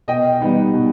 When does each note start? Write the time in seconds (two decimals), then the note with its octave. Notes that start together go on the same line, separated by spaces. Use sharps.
0.08 B2 D#5 G5
0.40 G3 B3 D#4
0.74 B2